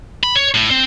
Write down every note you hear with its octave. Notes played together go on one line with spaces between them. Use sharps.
B5
C#5
A2
C4